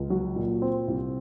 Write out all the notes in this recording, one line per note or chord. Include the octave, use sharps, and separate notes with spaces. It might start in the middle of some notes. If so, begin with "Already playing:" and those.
Already playing: C#2
F#3
A#2
C4
C2